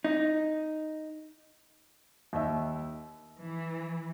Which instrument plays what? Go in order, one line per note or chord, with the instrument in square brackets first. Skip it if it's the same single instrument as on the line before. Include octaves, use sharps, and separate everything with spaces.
[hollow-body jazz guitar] D#4
[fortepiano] D#2 E5
[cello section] E3